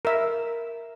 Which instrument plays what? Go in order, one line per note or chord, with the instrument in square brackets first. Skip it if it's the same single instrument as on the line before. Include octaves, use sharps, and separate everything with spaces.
[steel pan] A#4 E5